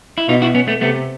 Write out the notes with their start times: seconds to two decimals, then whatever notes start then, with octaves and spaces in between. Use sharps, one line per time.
0.18 E4
0.29 B2 D#4 F4
0.42 E4 F#4
0.55 B3 C#4
0.68 A3 B3
0.81 C3 A3 B3